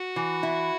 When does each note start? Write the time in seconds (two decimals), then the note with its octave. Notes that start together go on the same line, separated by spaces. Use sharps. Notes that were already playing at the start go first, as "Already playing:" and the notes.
Already playing: F#4
0.16 E3
0.43 E4